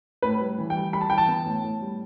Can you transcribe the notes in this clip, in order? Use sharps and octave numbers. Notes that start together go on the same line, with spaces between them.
A2 B4
G3
E3
G5
G3
G3 B5
A5
E3 G5
A5
B3
A2
A2
G3